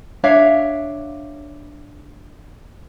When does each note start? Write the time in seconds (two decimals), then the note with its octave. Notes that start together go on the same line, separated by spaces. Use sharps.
0.24 D4 C#5 E5 F5